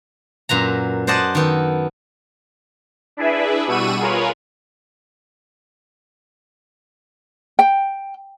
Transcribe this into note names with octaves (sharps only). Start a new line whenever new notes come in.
F#2 A#2 B4 A#5
C5 D5 D#5 F#5 A5
D#3 B3 A4
D4 E4 G#4 B4 E5
B2 G3 F#5 C#6 E6 D#7
F4 G#4 A#4 B4 C#5
G5